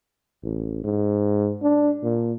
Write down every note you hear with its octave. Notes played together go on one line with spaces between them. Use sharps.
A1
G#2
D4
A#2